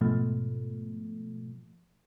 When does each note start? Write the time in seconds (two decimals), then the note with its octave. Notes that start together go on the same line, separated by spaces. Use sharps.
0.01 G#2 B2 F3 A3